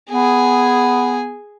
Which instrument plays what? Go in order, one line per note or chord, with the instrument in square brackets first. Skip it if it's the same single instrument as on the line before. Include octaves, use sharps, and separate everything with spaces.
[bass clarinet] B3 [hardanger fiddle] G#4 G#5